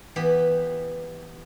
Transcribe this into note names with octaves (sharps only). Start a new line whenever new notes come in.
E3 B3 G4